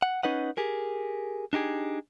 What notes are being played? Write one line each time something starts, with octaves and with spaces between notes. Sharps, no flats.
F#5
C#4 D#4 B4 D#5 F#5
G4 G#4 A#4
D4 D#4 G4 G#4